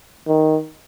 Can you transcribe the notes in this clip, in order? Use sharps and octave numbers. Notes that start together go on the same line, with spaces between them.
D#3